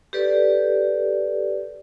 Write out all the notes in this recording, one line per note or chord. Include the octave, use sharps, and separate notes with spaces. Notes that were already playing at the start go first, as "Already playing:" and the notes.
G4 A4 B4 D5